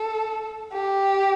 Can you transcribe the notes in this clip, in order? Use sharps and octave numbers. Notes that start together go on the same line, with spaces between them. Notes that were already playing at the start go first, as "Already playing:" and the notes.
Already playing: A4
G4